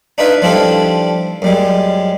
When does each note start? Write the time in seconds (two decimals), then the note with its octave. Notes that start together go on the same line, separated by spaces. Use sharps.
0.18 D4 D#4 F4 B4 E5
0.42 F3 G3 D4 E4 F4 A4
1.42 F#2 G3 G#3